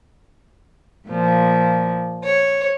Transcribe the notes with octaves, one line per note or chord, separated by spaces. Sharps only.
A#2 F3
C#5